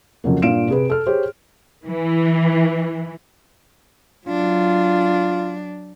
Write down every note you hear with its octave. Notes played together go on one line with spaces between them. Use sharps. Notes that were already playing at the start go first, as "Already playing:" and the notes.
F2 C#3 F#3 A#3
G2 A#2 F5 D7 E7
C3 G#4 B4
A4 F6
G4 G#4 C5 C#5
E3
F#3 D4 F4